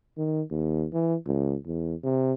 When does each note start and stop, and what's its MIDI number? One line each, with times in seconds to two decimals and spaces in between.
0.18 0.41 51
0.51 0.86 39
0.93 1.15 52
1.26 1.56 37
1.66 1.95 40
2.03 2.34 48